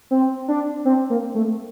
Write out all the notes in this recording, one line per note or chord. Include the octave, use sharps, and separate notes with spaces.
C4
D4
C4
A#3
A3